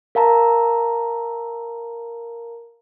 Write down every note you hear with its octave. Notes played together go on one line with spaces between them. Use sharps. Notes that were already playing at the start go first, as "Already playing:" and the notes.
A#4 F5 A5 A#5